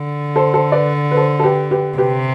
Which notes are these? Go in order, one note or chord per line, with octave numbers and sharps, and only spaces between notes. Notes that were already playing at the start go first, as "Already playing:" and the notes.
Already playing: D3
A4 C5
A4 C5
B4 D5
B4
A4 C5
A4
G4 B4
G4 B4
C3 G4 B4